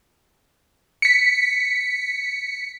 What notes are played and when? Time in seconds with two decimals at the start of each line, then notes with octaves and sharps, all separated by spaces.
1.02 B6 C#7